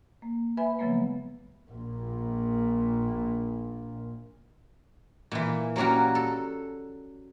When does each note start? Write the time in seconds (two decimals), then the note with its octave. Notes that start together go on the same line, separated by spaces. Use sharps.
0.22 A#3
0.57 B4 E5 G#5 B5
0.79 C#3 F3 F#3 G#3 A#3 B3
0.91 B3
1.71 A#1 A#2
5.31 A#2 E3
5.76 F#3 G3 A#3 C#4 F#4
6.15 A4